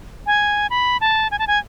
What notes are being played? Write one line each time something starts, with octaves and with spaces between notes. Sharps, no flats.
G#5
B5
A5
G#5
A5
G#5